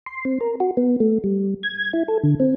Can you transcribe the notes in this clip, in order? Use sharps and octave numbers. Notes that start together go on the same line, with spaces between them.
C6
C4
A#4
F#4
B3
A3
G3
G#6
E4
A4
D3
C4